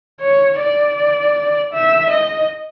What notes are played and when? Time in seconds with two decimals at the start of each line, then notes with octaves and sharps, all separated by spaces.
0.21 C#5
0.60 D5
1.73 E5
2.10 D#5